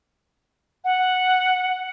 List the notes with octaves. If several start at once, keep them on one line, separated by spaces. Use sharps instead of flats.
F#5